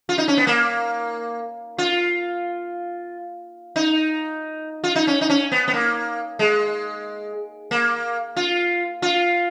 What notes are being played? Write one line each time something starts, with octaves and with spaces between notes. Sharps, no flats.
F4
D#4
C#4
B3
A#3
F4
D#4
F4
D#4
C#4
D#4
C#4
B3
B3
A#3
G#3
A#3
F4
F4